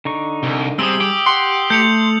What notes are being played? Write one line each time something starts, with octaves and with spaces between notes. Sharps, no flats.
D3 D#4 C#6
C2
C3 G3 G#4 D#6 E6
G4
F#5 C6
A3 G6 C#7 F7